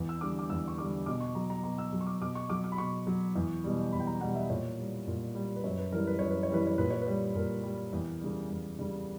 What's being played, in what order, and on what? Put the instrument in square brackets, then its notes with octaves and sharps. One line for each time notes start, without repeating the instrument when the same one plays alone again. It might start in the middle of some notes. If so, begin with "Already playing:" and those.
Already playing: [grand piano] E2
E6
D3 G3 D6
D6
E2 E6
C#6
D3 G3 D6
B2 D6
C#6
F#3 A#5
A#5
B2 A#5
E6
F#3
C#6
D6
B2 D6
C#6
F#3 D6
D6
B5
B2 C#6
F#3
E2
B2 G3
E2 B5
G5
A#5
B2 G3 F#5
E5
A#2 C#5
G3
A#2
G3
B4
F#2 C#5
B4
E3 G3 A#4
B4
F#2 C#5
B4
C#5
E3 G3 B4
C#5
A#2 B4
C#5
G3 B4
A#2 A#4
G3
E2
C#3 G3
E2
C#3 G3